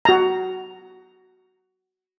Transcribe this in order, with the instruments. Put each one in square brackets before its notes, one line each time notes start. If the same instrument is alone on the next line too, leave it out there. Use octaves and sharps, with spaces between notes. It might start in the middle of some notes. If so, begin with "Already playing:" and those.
[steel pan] F#4 A#5